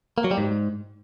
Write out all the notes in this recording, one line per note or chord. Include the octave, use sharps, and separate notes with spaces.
A#3
F#3
G3
G#2